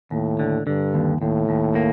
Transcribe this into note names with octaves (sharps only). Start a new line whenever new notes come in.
D#2 A2
D3
G2 D3
D#2
D#2 A2
D#2
A#3